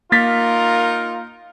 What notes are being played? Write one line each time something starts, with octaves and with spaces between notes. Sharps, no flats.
A#3 D#4 F4 A#4 A6 B6